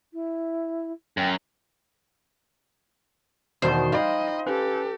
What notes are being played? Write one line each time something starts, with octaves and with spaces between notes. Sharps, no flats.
E4
F#2 G5
E2 B2 D#3 C5 D5
D#4 F4 D#5 G5 B5
C#4 G4 A4 B4